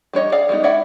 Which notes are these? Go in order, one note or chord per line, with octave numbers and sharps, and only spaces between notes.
G3 D4 C#5 D#5
G#4 D5 F5
G3 G#3 B3 D#4
G#3 E4 D5 E5 F#5